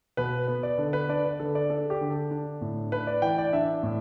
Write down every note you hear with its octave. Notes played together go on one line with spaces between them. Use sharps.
B2 B4
B3 B4
D5
D3 A4
B4
D4 D5
B4
D3 A4
D5
D4 A4
G4
D3
A4
D4
A2
D4 B4
D5
E3 G5
D5
D4 E5
A2